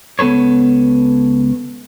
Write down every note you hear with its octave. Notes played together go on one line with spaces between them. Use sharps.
C#2 B3 A4 B4 C#5